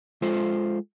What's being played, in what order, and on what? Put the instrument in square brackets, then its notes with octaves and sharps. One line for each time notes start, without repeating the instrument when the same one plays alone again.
[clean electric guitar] G#3 F4 A4 C5